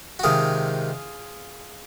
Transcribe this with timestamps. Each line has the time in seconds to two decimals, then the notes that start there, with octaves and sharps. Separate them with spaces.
0.19 F#4
0.24 C3 D#3 G#3 F4 G#4